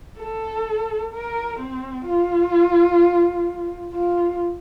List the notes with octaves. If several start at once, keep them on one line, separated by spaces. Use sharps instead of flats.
A4
A#4
C4
F4
F4